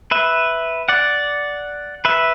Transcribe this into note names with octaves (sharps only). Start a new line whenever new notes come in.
B4 E5
D5 F#5
B4 E5